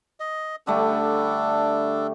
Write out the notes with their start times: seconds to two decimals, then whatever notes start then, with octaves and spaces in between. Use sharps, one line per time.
0.20 D#5
0.67 D3 G3 A3 D4 A4